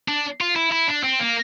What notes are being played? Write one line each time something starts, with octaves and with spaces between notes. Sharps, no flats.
D4
F4
E4
E4
D4
C4
A#3